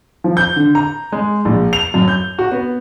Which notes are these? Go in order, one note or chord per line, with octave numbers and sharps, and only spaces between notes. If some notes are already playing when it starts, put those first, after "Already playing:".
F3
G6
D3
A#5
G#3
A#1
F7
F#2
G6
F#4
B3